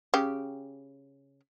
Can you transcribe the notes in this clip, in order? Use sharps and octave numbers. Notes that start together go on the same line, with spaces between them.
C#3 G4